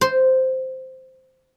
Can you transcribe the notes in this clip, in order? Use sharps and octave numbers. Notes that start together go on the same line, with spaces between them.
C5